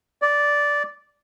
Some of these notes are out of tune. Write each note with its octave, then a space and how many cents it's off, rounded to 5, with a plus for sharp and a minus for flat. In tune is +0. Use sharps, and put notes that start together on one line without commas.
D5 -10